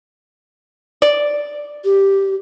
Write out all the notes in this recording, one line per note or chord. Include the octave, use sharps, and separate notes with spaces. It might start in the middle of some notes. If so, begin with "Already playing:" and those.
D5
G4